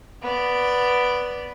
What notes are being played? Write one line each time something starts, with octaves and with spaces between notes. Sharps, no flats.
B3 D5